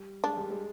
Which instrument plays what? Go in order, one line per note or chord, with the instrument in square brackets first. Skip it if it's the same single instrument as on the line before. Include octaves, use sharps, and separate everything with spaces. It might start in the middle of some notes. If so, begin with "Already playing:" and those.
Already playing: [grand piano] G3
[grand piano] G#3 [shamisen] D4
[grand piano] G3
G#3